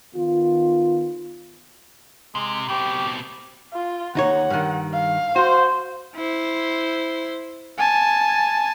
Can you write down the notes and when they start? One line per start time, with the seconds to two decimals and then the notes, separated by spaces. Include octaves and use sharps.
0.16 D#3 B3 F4
2.35 C3 G#3
2.69 B2 C4 G4
3.73 F4
4.15 D#2 D#4 C#5 F#5
4.50 G2 D#3
4.94 F5
5.36 F#4 C5
6.16 E4 C5
7.78 G#5 A5